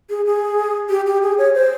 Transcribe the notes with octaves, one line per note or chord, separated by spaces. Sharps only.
G#4
G#4
G4
G4
G#4
C#5
C5